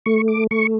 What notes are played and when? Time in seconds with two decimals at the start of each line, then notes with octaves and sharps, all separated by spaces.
0.06 A3 C#6
0.28 D6
0.51 A3 C#6